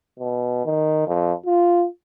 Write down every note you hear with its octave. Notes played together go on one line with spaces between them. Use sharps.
B2
D#3
F2
F4